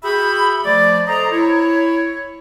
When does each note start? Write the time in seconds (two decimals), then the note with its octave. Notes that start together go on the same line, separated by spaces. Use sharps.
0.04 F#4 G#4 E5 G5 B5
0.65 F3 A3 D5
1.08 A4 C5 D#5 A#5
1.31 E4 C#5